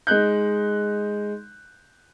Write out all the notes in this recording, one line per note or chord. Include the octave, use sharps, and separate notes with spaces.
G#3 D#4 F#6 G6